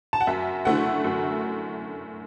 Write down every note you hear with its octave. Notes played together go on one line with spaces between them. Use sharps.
A5
F#5
F#2 E5
D3 A3 E4 F#5
F#2